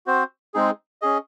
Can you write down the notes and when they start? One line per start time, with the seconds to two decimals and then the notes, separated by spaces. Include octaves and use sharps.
0.06 C4 F#4 C5
0.54 G#3 C4 D#4 G#4
1.02 C#4 G#4 D#5